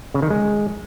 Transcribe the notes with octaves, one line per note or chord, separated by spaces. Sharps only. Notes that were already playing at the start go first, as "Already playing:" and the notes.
C#3
D#3
G#3